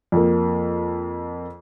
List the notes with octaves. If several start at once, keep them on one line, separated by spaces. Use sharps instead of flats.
F2 A#3